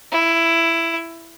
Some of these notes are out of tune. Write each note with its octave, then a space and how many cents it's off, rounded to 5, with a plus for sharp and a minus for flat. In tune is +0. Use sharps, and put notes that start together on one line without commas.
E4 +10